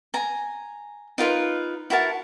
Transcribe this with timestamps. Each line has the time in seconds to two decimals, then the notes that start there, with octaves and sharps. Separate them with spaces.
0.14 G#5 A#5
1.18 D#4 F4 A#4 B4
1.90 E4 F#4 A#4 A5